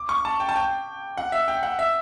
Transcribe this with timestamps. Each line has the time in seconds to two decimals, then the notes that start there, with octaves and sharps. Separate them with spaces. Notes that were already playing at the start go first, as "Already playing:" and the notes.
Already playing: D6
0.09 C#6
0.25 A5
0.40 G5
0.49 A5
0.56 G5
1.17 F#5
1.32 E5
1.48 G5
1.63 F#5
1.79 E5